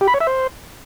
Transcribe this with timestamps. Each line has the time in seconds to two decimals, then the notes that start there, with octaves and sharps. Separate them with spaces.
0.01 G4
0.08 B5
0.14 C#5
0.21 E5
0.27 C5